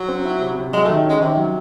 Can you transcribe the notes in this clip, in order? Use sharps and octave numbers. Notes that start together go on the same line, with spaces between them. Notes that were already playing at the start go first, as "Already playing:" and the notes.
Already playing: F#3
C4
E4
C3
C3
F#3 G#3
D#3 A3
G#3 C#4
C3 D#3
F#3